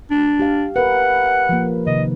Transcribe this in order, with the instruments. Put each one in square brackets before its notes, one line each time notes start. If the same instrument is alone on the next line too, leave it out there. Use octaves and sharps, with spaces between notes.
[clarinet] D4
[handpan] G4 F5
[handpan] A#4 B4 [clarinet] F#5
[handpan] F3 A#3
[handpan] C3 D#3 [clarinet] D#5